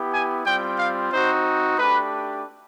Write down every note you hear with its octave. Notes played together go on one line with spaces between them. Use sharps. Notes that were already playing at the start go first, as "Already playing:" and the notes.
Already playing: B3 E4 G4
G#5
G3 C4 F4 G5
F5
C4 D#4 F#4 C5
A3 D4 G4 B4